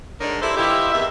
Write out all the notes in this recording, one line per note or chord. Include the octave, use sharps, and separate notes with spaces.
D3 G#3 D#4 A#4 C#5 D5
E4 G4 A4 C5 E5
E3 E4 F4 G4 D#5 E5
E2 C3 D#3 E5